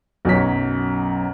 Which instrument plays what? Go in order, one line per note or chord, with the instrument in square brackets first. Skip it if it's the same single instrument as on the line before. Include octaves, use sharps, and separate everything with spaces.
[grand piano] B1 F#2 C#5 B6